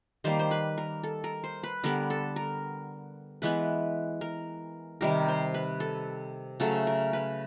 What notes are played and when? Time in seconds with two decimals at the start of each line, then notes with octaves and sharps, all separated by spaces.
0.24 D#3 G3 A#3 C5
0.39 C5
0.51 B4
0.78 A#4
1.04 A4
1.24 A#4
1.44 C5
1.63 B4
1.84 D3 G3 B3 A#4
2.10 A4
2.36 A#4
3.42 E3 G#3 B3 B4
4.21 A#4
5.01 C3 D#3 G3 A#4
5.28 C5
5.54 B4
5.80 A4
6.60 C#3 F#3 A3 A4
6.87 A#4
7.13 B4